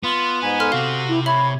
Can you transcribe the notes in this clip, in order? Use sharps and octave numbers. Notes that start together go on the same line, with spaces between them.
B3 F4
G#2 G#5 B5
A4 C6 F6
C3 F#4 C5 F5
E4
C#5 E5 B5 F#7